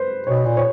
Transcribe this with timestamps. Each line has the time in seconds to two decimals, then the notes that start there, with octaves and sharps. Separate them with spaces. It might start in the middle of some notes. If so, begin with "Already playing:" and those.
Already playing: B4 C5
0.27 B2 C#5
0.46 A#2
0.57 C#5